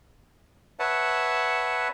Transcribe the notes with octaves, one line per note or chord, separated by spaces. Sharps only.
B4 C#5 E5 F#5 A5